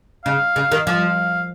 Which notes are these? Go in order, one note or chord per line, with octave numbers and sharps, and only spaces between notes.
C#3 F5
C#3
D#3
F3 F5